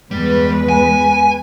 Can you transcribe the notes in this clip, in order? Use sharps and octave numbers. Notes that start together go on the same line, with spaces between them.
E2 G3 G#3 B4
G#5